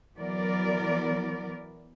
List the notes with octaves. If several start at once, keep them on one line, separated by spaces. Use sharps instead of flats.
E3 F#3 B3 A#4 D5